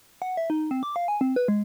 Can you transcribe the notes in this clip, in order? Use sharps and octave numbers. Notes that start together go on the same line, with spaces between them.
F#5
E5
D#4
C4
D6
F5
G#5
C4
B4
G#3